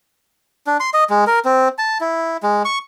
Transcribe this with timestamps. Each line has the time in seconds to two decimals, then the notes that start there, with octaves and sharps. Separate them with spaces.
0.67 D4
0.80 C6
0.94 D#5
1.10 G#3
1.27 A#4
1.45 C4
1.78 A5
2.01 E4
2.43 G#3
2.65 C#6